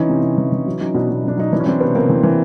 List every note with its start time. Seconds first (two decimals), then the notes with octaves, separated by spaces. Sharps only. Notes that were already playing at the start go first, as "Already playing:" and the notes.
Already playing: E3 C#4 D#4
0.09 C3
0.23 C3
0.38 E3
0.52 E3
0.66 F#3
0.80 F#3 C#4 D#4
0.94 B2 D4 E4
1.10 B2
1.24 F#3 D4
1.37 F#3 D#4
1.52 E3 D4 E4
1.60 C#4
1.66 E3 C4 D4
1.80 C3 B3 C#4
1.95 C3 A#3 C4
2.09 E3
2.23 E3